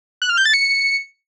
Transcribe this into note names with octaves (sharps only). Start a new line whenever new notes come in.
F#6
F6
G6
A6
C#7